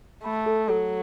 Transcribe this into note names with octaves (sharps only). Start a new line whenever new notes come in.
A3 B5
A4
F#3 A4